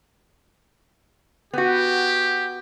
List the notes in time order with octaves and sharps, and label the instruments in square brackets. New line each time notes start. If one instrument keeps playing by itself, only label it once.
[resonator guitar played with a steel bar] B3 F#4 [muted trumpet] G4